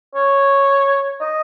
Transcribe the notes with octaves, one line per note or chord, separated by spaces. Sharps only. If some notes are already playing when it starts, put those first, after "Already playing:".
C#5
D#5